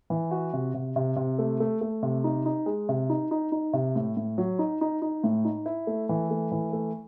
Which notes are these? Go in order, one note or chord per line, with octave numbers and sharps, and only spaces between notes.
E3
F#4
C3
C3
C3
C3
A3
A3
A3
C3
D#4
D#4
G#3
C3
D#4
D#4
D#4
C3
A2
A2
F#3
D#4
D#4
D#4
A2
D#4
E4
A3
E3
A3
E3
A3